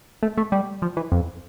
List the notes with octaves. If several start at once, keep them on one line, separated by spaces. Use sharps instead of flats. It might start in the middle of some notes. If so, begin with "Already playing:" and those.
A3
A3
G3
F3
E3
F2